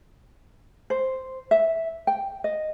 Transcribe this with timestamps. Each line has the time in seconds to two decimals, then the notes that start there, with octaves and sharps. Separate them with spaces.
0.90 C5
1.51 E5
2.07 G5
2.44 D#5